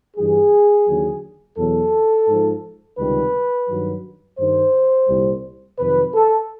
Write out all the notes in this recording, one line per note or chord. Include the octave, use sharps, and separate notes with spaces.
G2 E3 G3 G#4
D#2 D3 F#3
E2 B2 F#3 A4
G#2 F3
C#2 C3 D#3 G3 B4
G2 D#3 F#3
G2 D#3 G3 C5
C2 A#2 G3
F2 C3 D#3 F#3 B4
A4